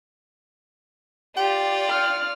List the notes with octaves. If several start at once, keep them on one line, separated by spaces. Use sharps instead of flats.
F4 G4 D5 G5
F6